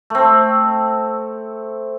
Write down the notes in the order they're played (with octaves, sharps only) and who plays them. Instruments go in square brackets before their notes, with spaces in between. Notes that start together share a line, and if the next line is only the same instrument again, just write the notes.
[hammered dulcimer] A3 C4